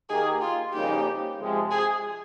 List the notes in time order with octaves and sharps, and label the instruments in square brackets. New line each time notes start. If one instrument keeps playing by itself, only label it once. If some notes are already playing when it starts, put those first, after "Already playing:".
[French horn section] D#3 A#3 D#4 G4 A#4 [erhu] G#4
[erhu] F4
[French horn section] F2 C#3 G3 A#3 D#4 [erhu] G4
[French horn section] C3 F3 G#3
[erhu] G#4